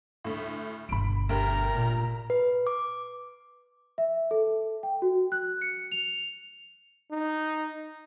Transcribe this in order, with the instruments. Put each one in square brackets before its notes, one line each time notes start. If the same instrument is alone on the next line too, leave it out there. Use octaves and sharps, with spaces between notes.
[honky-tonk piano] D2 A2
[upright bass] G1 B2 [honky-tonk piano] B5 D7
[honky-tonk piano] D2 G4 A#4 [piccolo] A#5
[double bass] A#2
[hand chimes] B4
D6
[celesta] E5
A4
G5
F#4
F#6
C#7
F7
[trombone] D#4